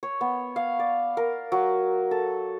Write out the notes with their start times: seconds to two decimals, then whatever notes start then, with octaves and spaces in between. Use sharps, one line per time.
0.03 C#5
0.21 B3
0.56 F5
0.79 D5
1.17 A#4
1.52 F#3
2.11 A4